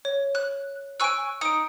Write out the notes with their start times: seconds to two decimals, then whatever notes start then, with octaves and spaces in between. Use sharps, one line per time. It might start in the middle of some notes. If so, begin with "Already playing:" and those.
0.05 C#5
0.35 F#6
1.00 G#5 C#6 E6 F#6 D7
1.41 D#4 D#6 D7